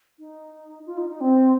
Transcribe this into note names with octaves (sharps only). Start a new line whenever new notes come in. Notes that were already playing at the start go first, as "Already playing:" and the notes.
D#4
F4
D#4
D#4
C4